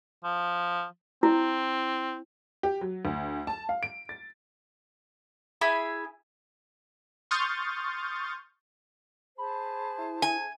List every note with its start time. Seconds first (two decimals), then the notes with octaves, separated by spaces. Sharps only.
0.24 F3
1.23 C4 E4
2.63 G4
2.81 F#3
3.05 D2
3.47 A5
3.69 F5
3.83 D7
4.09 A6
5.61 E4 G#4 B5
7.31 C6 C#6 D#6 F6 G6 A6
9.38 G#4 C5 A5 B5
9.98 E4
10.22 G#5